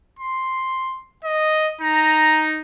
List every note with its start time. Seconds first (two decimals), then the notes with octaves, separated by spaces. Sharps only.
0.19 C6
1.24 D#5
1.81 D#4 A#5